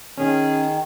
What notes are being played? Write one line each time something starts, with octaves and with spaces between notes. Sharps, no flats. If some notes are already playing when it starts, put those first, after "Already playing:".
D#3 C#4 G#4